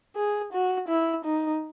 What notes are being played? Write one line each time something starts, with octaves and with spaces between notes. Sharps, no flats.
G#4
F#4
E4
D#4